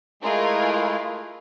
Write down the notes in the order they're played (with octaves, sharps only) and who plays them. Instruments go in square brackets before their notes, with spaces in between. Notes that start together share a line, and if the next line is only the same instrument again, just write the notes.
[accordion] G#3 A3 E4 [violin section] F4 G#4 A#4